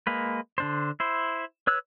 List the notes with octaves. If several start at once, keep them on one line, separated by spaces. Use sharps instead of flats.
G#3 A#3 B4
D3 D4 C5
E4 C5
B4 C#5 E6 F#6